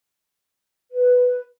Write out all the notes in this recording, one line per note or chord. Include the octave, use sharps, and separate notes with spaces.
B4